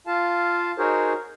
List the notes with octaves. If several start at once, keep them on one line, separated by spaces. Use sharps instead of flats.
F4 F5 A5
D#4 F#4 G#4 A#4 C5 C#5